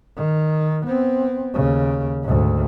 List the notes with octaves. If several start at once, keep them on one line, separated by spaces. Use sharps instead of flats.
D#3
B3 C4
D#2 C#3
D2 G#2